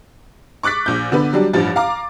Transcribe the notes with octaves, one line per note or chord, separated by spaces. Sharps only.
C#6 D6 F#6 A6 B6
A#1 G6
D3 B3 B4
F#3 G3 D4
A1 G2 F3 A6
F5 A#5 D6